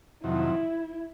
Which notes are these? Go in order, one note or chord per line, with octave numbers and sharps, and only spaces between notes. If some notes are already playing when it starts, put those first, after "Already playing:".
F2 C3 D#3 F#3 E4